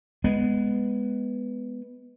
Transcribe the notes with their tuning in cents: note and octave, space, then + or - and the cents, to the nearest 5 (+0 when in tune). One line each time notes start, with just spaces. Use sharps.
G#3 +0 B3 +0